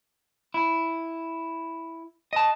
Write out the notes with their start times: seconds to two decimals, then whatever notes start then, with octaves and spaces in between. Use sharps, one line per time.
0.54 E4
2.33 D#5 A5